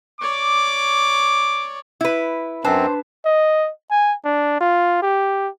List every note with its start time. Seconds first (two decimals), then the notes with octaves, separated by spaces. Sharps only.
0.21 C#5 D5 D6
2.01 E4 B4
2.65 F#2 C4 D4 B4 C5 A5
3.25 D#5
3.91 G#5
4.25 D4
4.61 F4
5.02 G4